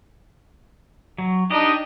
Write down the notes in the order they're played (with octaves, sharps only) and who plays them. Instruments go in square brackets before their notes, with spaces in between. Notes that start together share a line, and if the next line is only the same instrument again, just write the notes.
[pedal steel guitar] F#3
[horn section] D4 D#4 [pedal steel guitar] G4 D#5